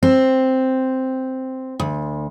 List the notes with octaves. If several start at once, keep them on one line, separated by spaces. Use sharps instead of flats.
C4
D2